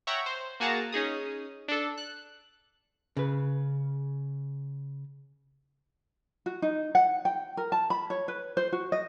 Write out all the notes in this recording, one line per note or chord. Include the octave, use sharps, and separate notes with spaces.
C#5 E5 F#5 G5 A#5 C#6
C5
A#3 F#4 G#4 A5 A#5
C#4 D#4 G#4 D#6
D4 A4
F#6
C#3 B4
F#4
D#4
F#5
G5
A#4
A5
B5
C#5
B4
C5
F#4
D#5